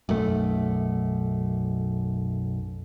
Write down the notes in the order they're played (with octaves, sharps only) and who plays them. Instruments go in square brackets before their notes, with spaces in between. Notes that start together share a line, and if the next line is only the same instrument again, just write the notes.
[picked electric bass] B1 F#2 A3